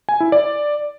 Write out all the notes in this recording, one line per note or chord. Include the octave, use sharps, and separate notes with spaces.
G#5
E4
D5